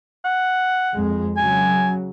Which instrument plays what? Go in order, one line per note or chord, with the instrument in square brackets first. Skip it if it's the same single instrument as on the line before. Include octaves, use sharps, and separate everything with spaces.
[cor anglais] F#5
[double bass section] F2 G#3
[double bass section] C#3 F#3 [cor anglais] G#5